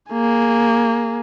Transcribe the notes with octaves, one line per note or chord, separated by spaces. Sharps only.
A#3 G#4